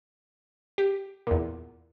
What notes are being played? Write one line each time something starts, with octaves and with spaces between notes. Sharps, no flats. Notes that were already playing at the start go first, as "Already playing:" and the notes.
G4
E2 A#2